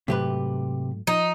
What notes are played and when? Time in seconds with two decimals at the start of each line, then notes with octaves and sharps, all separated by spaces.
0.08 G#2 C3 F#3 A3 G4 B4
1.07 F3 D#4